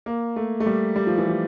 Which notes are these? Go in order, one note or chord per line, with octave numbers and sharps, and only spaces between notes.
A#3
A3
A3
G3
G3
F3
E3
F3